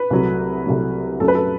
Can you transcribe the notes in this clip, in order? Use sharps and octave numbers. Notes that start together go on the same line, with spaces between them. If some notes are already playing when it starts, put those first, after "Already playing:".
Already playing: B4
C2 C3 F#3 A3
C2 C3 F#3 A3
F#2 F#3 A3 A4
B4
A4